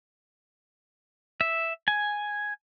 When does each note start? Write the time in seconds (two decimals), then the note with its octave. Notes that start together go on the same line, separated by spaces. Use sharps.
1.41 E5
1.88 G#5